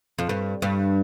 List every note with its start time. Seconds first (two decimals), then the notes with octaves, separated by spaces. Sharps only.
0.18 F2
0.29 G2
0.62 G2